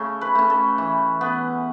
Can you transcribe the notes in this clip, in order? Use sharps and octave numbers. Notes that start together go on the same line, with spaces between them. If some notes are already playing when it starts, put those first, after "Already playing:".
Already playing: C#3 A3 C#4 A4
B4
A3 C#4
A4
E3
B3